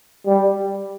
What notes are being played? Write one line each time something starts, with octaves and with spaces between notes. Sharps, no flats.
G3